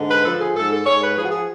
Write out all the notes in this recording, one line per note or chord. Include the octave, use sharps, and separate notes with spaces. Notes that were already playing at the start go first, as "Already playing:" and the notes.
Already playing: G#2 D3
B4
F3 A4
G#4
G#2 A4
A4
G#2 C#5
B4
F3 G#4
F#4
G#4